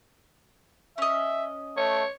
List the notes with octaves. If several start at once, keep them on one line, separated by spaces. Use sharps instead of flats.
C#4 D#5 E5
A3 C#5